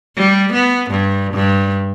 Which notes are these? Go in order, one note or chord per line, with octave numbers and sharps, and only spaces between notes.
G3
B3
G2
G2